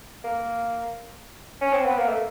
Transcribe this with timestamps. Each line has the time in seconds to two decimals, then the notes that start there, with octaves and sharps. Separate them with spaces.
0.24 A#3
1.61 C#4
1.73 C4
1.85 B3
1.97 A#3
2.09 A3